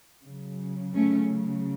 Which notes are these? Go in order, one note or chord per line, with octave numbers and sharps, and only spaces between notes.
C#3 F#3
A3 C#4